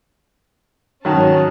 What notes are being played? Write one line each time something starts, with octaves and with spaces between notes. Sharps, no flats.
G#2 D#3 F#3 C#4 A5